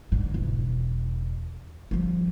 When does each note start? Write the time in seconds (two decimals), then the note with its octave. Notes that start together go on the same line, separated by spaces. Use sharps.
0.12 G#2 D3
0.34 E1
1.91 F3 G3